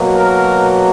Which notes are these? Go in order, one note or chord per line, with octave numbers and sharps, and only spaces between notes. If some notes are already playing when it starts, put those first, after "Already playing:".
Already playing: B2 F#3 A#3
A#4